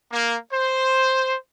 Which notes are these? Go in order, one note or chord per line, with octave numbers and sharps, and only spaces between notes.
A#3
C5